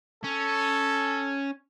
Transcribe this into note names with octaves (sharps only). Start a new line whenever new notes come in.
C#4 A4 G#5